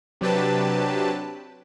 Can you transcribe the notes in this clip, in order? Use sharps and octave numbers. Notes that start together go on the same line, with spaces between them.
C3 F#3 D4 G4 B4 A5